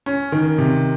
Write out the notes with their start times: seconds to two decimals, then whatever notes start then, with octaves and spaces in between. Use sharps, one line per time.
0.06 C#4
0.32 D#3
0.58 C3